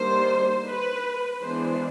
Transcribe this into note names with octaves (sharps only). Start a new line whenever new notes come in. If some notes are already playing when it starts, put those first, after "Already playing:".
Already playing: D#3 G3 A#3 D4 C5
B4
E3 G#3 B3 D4 C5